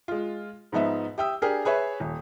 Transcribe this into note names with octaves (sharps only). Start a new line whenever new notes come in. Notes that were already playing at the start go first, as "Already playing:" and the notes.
G#3 F4
G#2 F3 B3 D#4 E5
G4 E5 G5 D#6 E6
D4 G4 G#4 A#4
G#4 B4 C#5 E5
D#1